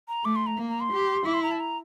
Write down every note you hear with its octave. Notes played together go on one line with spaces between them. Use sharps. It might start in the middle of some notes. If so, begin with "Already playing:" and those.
A#5
A3 D6
C6
A#5
A#3
A#5
C6
G4
E4 D6
C6
A#5
A5
A#5